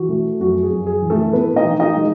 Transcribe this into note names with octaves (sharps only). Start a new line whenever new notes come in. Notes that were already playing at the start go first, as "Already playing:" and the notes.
Already playing: E3 F#4
A3
F#2 F#4
G#4
F#2
G#4
E3
A3 A4
A2 B3 B4
D#4 D#5
E3
D#4 D#5
G#3